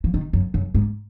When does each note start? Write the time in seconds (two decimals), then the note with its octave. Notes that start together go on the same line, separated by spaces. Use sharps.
0.04 F3
0.14 D#3
0.33 F#2
0.54 F#2
0.75 G#2